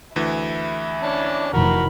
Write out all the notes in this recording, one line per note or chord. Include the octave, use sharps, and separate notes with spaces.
D2 E3 E4
C#4 D4 A5
F1 D#3 E3 F#4 A#4 B5